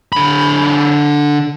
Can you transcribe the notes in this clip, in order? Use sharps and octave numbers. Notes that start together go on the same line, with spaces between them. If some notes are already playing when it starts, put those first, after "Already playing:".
D3 B5